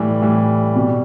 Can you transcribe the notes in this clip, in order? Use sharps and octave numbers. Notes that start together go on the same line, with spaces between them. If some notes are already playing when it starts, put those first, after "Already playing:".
Already playing: A2 E3 G3
A2 E3 G3
B2 G3